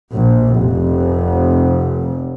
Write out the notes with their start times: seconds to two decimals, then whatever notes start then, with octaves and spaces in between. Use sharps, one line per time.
0.14 A#1
0.61 F1